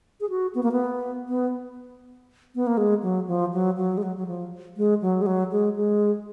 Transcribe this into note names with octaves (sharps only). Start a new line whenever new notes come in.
G#4
F#4
B3
A#3
B3
B3
B3
A#3
G#3
F#3
F3
F#3
F#3
G#3
F#3
F#3
F3
G#3
F#3
G#3
F#3
G#3
G#3